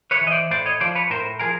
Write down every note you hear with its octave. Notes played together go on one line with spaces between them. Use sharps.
B4 C#5
E3
D#5
C5 D5
A2 C5 D5
C#5 D#5
F3 C5 D5
B4 C#5
A2 A#4 C5
F3 G#4 A#4